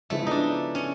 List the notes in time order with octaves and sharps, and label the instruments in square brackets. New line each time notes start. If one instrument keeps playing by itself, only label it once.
[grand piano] C#3 F3 G#3 B3 E4 [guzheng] A3
[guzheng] D4 D#4
C#4